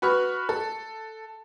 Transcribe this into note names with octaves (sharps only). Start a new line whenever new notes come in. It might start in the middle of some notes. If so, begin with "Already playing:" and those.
F#4 B4 B5 C#6 F6 F#6
A4